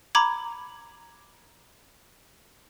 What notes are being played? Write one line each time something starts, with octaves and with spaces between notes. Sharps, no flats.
A#5 B5 D6 G#6